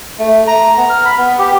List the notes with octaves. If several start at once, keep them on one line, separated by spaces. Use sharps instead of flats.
A3
A#5
B3
F6
B5
B3
G4